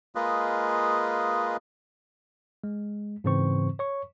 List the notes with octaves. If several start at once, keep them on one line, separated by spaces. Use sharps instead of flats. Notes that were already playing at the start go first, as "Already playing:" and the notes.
G#3 A#3 F4 G#4 B4 D#5
G#3
G#2 C#3 E3 C4 C5 C#6
C#5 C#6